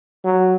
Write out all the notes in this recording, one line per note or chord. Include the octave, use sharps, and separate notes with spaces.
F#3